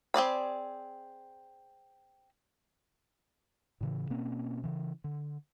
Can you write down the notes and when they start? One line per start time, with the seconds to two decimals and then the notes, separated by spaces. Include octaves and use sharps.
0.14 C4 G#4 D5 B5
3.81 A2 C#3 E3
4.10 B2 A#3 C4 C#4
4.64 C#3 E3
5.04 D3